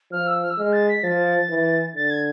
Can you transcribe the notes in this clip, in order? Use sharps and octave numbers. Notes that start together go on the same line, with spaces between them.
F3 F6
E6
F6
E6
G#3 F6
A6
B6
F3 A6
E3
D3 A6
G#6